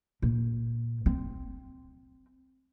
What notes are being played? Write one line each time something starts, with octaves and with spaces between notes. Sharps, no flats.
A#2
C4